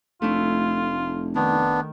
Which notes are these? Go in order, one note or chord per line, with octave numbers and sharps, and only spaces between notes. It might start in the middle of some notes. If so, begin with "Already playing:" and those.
F1 A3 D4 E4 F4
D#3 B3 D4